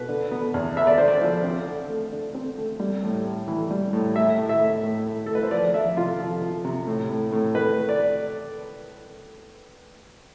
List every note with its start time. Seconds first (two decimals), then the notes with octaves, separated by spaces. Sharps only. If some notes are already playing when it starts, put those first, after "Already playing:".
Already playing: B2 B4
0.09 D3
0.31 B3
0.54 E2
0.76 B3 E5
0.87 D5
0.98 D3 C5
1.08 D5
1.21 F3
1.44 C4
1.67 D3
1.89 A3
2.12 D3
2.34 C4
2.57 A3
2.80 G3
3.03 A2
3.25 A2
3.48 E3
3.71 G3
3.93 A2
4.16 A2 E5
4.38 A2
4.49 E5
4.61 A2
4.83 A2
5.06 A2
5.26 A2 A4
5.35 B4
5.43 C5
5.51 F3 D5
5.74 F3 E5
5.97 C3 F4
6.19 F3
6.42 F3
6.65 C3
6.87 A2
7.10 A2
7.32 A2
7.55 A3 B4
7.78 A3
7.89 D5